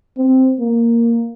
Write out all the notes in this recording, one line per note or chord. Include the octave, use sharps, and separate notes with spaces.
C4
A#3